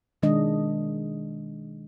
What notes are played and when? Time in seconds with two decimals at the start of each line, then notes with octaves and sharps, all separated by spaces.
0.22 B2 D#3 G#3 D4 D#5